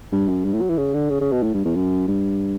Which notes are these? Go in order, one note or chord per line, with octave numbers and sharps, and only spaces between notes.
G2
F#2
G2
A2
F#3
E3
C#3
D3
C#3
C#3
B2
A2
G2
E2
F#2
G2